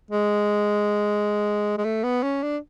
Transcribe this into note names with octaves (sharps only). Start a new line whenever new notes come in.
G#3
G#3
A3
B3
C#4
D4